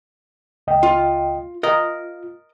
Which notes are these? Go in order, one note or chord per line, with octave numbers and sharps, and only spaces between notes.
C#2 D#5 G5
F4
F4 A#4 D#5